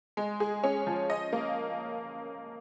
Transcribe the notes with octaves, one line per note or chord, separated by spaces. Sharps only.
G#3
G#4
C#4
F3
D#5
A#3